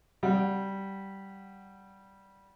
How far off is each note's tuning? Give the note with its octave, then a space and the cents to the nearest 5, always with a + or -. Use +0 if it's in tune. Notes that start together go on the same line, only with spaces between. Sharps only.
G3 -10 F#5 -10